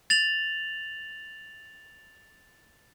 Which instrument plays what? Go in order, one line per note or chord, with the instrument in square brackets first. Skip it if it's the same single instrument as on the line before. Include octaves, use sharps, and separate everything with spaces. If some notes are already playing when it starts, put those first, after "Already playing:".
[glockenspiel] A6 F7 F#7